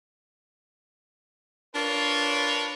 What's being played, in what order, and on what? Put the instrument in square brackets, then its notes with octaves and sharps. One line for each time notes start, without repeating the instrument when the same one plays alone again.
[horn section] D4 F4 A#4 B4 C#5